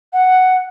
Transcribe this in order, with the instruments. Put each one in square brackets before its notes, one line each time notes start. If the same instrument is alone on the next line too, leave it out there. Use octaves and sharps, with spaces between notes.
[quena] F#5